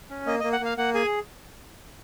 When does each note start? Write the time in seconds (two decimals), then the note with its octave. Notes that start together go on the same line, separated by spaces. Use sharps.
0.10 C#4
0.26 A#3 D#5
0.40 A#3 D#5
0.53 F#5
0.60 A#3 F5
0.77 A#3 F#5
0.94 G#4 G#5